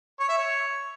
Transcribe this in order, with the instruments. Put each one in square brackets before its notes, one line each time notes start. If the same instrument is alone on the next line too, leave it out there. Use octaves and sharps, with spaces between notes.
[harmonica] C#5
E5
C#5